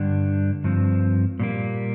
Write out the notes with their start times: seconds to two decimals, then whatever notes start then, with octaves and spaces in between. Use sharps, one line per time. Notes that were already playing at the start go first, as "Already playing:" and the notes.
Already playing: G2 D3 G3 D4
0.64 G2 F3 C4
1.40 A#2 G3 A#3